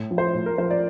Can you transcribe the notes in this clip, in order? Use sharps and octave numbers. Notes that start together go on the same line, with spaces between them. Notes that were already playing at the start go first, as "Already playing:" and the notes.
Already playing: A2
F3
C5
A2
A#4
F3 C5
D5